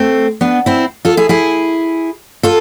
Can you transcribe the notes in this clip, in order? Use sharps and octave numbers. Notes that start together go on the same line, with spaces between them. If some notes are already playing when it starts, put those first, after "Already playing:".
Already playing: A3 C4
B3 D4
C4 E4
F4 A4
E4 G#4
E4 G#4
F4 A4